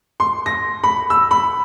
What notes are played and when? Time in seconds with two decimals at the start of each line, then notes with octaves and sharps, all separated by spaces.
0.20 C6
0.46 A#6
0.83 B5
1.10 E6
1.31 B5